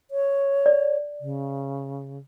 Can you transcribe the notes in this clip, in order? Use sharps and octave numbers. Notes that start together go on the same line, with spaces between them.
C#5
D5
C#3